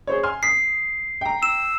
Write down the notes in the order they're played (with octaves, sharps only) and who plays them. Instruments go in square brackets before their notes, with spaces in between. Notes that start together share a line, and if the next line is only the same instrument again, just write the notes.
[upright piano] G#4 C5 C#5
G#5 C6 F6
[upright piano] D#6 B6 [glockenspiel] C7
[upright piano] G5 A#5
[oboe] E6 [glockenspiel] E7